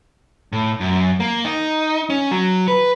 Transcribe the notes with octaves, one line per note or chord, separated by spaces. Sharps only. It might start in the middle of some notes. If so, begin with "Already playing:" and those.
A2
F#2
A#3
D#4
C#4
F#3
B4